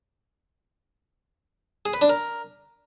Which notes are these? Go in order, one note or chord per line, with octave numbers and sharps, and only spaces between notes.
G#4
B4
D4
A#4